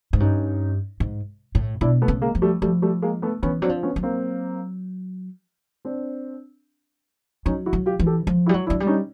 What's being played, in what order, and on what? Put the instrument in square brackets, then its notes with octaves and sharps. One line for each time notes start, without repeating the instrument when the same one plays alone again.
[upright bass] G#2
[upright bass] G2 [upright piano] C#4 D#4
[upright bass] G#2
A2
[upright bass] B2 [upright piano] D4 E4
[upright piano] A3 B3
[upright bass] C#3
[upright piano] G#3 A#3
[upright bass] F3
[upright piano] G3 A3
[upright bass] F3 [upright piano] G3 A3
[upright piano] G3 A3
G#3 A#3
A3 B3
[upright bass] E3 [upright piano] B3 C#4
[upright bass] F#3 [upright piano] C4 D4
[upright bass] F3
[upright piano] B3 C#4
[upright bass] F#3
[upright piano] A#3 C4
C4 D4
[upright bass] F#3 [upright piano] C#4 D#4
[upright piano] E4 F#4
[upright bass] F#3
[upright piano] F4 G4
[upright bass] E3
[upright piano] G4 A4
[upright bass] F3
[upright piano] E4 F#4
[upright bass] G3
F#3
[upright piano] D4 E4
[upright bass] F#3
G3
[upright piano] C#4 D#4